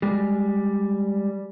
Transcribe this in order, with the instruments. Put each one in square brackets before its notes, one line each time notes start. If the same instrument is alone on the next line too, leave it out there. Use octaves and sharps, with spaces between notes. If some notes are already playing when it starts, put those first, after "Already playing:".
[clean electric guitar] G3 G#3